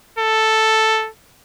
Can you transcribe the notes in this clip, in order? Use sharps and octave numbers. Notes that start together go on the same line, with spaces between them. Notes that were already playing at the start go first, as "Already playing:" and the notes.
A4